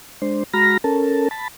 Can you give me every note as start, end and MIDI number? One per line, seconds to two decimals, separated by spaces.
0.22 0.43 56
0.22 0.43 62
0.22 0.43 72
0.54 0.77 56
0.54 0.77 66
0.54 0.77 82
0.54 0.77 83
0.54 0.77 89
0.54 0.77 94
0.84 1.28 61
0.84 1.28 69
0.84 1.28 70
0.84 1.28 81
1.31 1.48 81
1.31 1.48 83